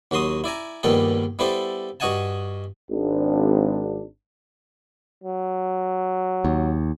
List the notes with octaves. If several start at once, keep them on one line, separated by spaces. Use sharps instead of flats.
D#2 F#3 F#4 C6 D#6
E4 D5 G#5 A#5
A#1 G2 A#2 D#3 B3 A4
G3 B3 E4 A4 C5 D5
G2 F#4 D#5 F#5 G#5 A5
G#1 D4
F#3
D#2